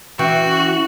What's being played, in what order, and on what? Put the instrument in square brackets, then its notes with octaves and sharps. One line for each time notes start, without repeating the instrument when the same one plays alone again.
[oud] E3 [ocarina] C#4 [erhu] F#4 [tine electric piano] G5 C#6